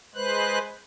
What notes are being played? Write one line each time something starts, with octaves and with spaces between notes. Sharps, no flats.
G#3 B4 C5 F#6